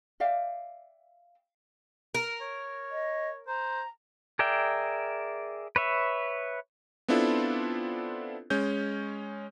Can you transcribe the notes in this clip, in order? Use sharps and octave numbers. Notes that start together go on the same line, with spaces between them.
D5 E5 F5 G5
A#4
C#5
D#5
C5 A#5
G#4 A#4 D5 E5 G5
B4 C#5 E5
B3 C4 D4 E4 F4 A4
G#3 C#4 G6